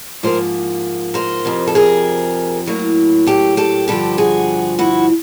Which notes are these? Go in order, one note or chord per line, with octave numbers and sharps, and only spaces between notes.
G#2 F3 A#3 A#4 C5
A#4 C5
F2 C3 F3
A4
G#4 A#4
A2 F#3 A#3
G4 A4
G4 A4
G2 D3 F3 G4 A4
F#4 G#4
E4 F#4